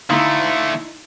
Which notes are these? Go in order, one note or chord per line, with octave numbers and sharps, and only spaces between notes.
D3 A3 D#4 E4 F5 B5 C6